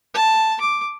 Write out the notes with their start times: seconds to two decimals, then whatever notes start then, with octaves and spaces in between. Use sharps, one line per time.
0.14 A5
0.61 D6